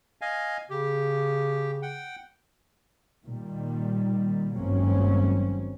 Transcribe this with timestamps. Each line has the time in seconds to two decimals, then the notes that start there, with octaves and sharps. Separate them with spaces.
0.21 D#5 F5 G#5
0.70 C#3 G4
1.82 F#5 G5
3.26 A#2 D#3 G3
4.56 G#1 G2 F#3 A#3 C4 C#4